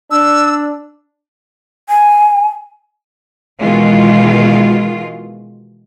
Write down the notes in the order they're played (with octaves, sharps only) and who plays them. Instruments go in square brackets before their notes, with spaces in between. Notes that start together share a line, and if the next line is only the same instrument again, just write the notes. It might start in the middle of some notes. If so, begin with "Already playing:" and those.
[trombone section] D4 [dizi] E6
[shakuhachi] G#5
[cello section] B2 D#3 E3 G#3 F4